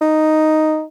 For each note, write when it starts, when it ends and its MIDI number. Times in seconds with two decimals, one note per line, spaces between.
0.01 0.83 63